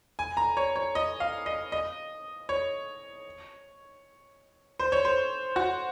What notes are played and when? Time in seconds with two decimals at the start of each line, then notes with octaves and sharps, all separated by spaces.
0.19 G#5
0.37 A#5
0.57 C#5
0.76 C#5
0.95 D#5
1.20 F5
1.46 D#5
1.72 D#5
2.49 C#5
4.79 C5
4.92 C#5
5.05 C5
5.56 F#4